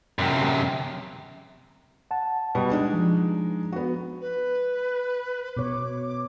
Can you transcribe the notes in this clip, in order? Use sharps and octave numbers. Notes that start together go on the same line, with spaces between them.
F#2 C3
F#5 A5
B2 G3
G#3 D4 D#4
F3
B3 F#4
B4
B2 C#5 D6